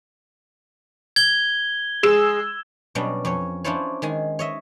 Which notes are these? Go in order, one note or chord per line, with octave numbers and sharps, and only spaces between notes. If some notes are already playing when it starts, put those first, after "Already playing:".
G#6 G7
G#3 G#4 E6 E7
B2 F#3 G3 C#4 D4
F2 C#4 C#5
C#4 D4 E4 F4 C5 C#5
D#3 G#3 G#5
C#5 D#5 E5